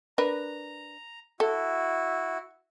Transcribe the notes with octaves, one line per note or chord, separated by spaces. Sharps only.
D4 A#4 B4 A#5
E4 F#4 A4